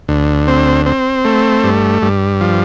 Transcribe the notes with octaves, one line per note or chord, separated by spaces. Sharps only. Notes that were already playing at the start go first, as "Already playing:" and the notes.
D2
C4
C4
A3
G2
G2
F3